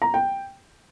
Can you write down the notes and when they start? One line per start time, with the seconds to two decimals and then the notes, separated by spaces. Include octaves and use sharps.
0.02 A#5
0.14 G5